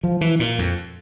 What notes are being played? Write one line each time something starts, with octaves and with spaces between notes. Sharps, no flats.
F3
E3
A#2
F2